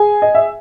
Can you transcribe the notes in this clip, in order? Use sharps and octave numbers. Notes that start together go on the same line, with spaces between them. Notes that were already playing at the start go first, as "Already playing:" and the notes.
Already playing: G#4 G#5
D#5
E5